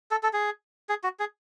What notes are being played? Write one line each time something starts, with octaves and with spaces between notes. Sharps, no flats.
A4
A4
G#4
G#4
F#4
G#4